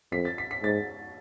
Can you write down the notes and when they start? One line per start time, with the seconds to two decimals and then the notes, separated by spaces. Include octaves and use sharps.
0.12 F2 B6
0.25 A6
0.38 B6
0.51 B6
0.63 G#2 A6